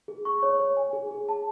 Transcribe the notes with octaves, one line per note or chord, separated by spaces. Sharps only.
G#4
C#6
C#5
C#5
G#5
G#4
G#4
A5